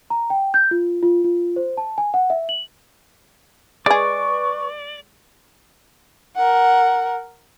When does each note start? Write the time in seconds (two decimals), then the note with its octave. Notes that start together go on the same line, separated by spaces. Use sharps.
0.10 A#5
0.30 G5
0.54 G6
0.71 F4
1.03 F4
1.24 F4
1.56 C5
1.77 A5
1.98 G#5
2.14 F#5
2.30 E5
2.49 F#7
3.86 G#3 G#4 B4 D5 C#6
6.36 A#4 F#5